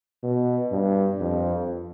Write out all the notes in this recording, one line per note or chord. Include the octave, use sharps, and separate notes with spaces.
B2
G2
F2